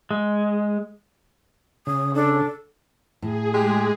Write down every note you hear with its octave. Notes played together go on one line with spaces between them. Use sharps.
G#3
C#3 D#6
D4 A4
A2 G#4
G#3 G4